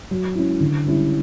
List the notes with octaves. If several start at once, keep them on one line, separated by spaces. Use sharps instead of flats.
F#3
C#4 E4
D3
G3 C#4 E4